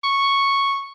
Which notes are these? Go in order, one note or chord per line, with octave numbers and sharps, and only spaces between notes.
C#6